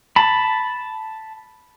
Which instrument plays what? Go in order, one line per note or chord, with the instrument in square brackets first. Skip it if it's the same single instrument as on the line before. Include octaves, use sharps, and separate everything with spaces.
[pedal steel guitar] A5 B5